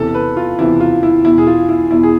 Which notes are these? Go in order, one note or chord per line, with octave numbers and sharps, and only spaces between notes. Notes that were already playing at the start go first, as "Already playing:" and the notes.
Already playing: E2 C3 E3 A4
B4
F4
E2 C3 E3 E4
F4
E4
E2 B2 E4
G#4
F4
E4
E2 B2 E4
G#4